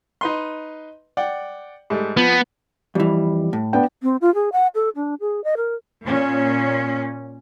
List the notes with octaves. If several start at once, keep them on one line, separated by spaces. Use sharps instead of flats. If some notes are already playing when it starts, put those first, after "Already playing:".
D#4 B4 C6
D5 F#5 G5
G#2 G3 A3
F3 B3
F2 E3 G3
A2
B3 D4 G5
C4
F4
G#4
F#5
A4
D4
G#4
D#5
A#4
A#2 C#4